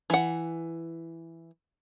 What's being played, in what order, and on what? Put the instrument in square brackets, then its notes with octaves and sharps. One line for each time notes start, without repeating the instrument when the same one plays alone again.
[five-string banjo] E3 F#5